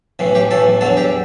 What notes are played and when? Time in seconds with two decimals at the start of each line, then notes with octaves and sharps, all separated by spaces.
0.19 B1 A2 E3
0.35 G4
0.51 B1 A2 E3 A4
0.81 E2 D3 F#3 A4
0.97 G4